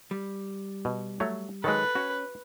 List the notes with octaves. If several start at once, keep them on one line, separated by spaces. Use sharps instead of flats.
G3
B2
F#3 A3 C#5
D#3 F#3 G#3 A4 B4
C#4 F#4